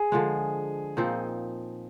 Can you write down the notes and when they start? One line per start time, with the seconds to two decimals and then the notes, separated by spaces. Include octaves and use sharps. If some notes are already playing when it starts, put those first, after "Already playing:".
Already playing: G#4
0.12 D3 F3 G#3
0.97 A#2 F3 C4 D#4